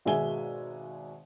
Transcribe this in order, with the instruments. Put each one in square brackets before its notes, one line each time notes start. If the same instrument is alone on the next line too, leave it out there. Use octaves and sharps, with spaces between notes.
[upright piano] G#1 B2 G#3 E5 G#5 G7